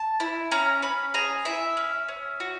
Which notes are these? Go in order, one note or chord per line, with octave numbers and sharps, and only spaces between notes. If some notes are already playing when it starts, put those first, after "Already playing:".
Already playing: A5
E4
C#4 A#5
C#4 B5
G#4 A#5
E4 E5
C#4
C#4
F#4